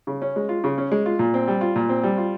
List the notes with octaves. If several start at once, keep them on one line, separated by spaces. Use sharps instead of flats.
C#3
C#4
G#3
F4
C#3
C#4
G#3
F4
A#2
C4
G3
F4
A#2
C4
G3
F4